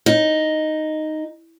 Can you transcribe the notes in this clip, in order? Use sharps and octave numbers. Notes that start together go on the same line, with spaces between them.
D#4